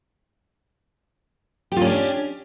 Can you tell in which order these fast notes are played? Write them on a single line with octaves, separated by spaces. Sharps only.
G4 F4 C#4 D4